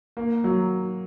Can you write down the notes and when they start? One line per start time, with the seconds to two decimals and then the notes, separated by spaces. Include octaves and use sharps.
0.17 A#3
0.44 F#3